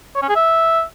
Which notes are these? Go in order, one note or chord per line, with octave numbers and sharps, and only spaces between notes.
C#5
C#4
G#4
E5